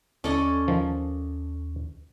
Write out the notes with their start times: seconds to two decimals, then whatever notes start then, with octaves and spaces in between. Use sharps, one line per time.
0.24 D#2 C#4 A4 D5 D#5
0.68 D#3 F3